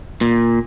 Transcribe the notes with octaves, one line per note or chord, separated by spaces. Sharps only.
A#2